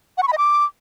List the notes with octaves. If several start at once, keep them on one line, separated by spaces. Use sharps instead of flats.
F#5
C#6
B5
D#5
D6